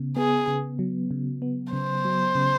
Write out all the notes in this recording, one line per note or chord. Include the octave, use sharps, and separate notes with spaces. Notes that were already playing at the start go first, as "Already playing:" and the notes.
Already playing: C#3 B3
B3 G#4
C#3
F#3
C#3
B3
C#3 C5
F#3
C#3